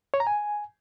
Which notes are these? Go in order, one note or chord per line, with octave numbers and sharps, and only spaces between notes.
C#5
A#5
G#5